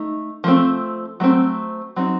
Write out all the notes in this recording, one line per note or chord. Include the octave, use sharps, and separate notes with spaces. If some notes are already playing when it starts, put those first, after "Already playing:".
Already playing: A3 D#4
F3 A3 C4
F#3 A3 C4
F#3 C4 D#4